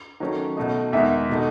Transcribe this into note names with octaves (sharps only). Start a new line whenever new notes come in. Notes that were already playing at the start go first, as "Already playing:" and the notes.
D#3 F#3 A3 C#4
B2 A3 D#4
E2 D#3 G#3 E5
B2 A3 D#4